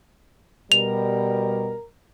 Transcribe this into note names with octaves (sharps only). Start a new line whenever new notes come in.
B2 G3 A#4 F7